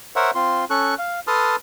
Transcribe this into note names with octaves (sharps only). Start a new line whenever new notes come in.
A#4 C5 C#5 E5 F#5
C4 F4 C6
C#4 A4 C#6 F#6
F5
A4 B4 A5 C6 D#6 F6